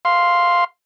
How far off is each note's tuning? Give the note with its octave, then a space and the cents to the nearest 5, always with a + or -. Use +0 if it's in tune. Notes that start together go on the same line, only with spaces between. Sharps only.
F5 +0 C6 +0